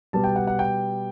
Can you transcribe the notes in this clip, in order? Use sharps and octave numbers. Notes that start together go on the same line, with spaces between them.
B2 G3 B3 A5
G5
F#5
F#5
G5